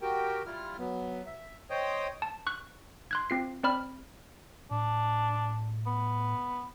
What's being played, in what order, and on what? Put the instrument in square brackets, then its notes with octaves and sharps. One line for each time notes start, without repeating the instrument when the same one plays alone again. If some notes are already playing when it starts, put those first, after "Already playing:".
[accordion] F#4 G4 A#4 G5
G3 E4 F4 F6
F#3 B3
E5
C5 C#5 D#5 G5 D#6
[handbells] A5
C#6 F#6
C6 F#6 G#6
C4 F4 C7
C4 D5 B5 F6
[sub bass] A2 [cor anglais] D4
[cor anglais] B3